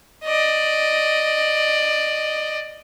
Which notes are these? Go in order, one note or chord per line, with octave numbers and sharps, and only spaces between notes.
D5 D#5